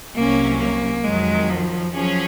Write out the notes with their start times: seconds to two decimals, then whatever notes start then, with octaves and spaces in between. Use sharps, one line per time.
0.15 C2 C3 F#3 A#3 C#4
0.59 A#3
1.04 F2 D#3 F#3 G#3
1.50 F3
1.94 F3 F#3 C#4 G#4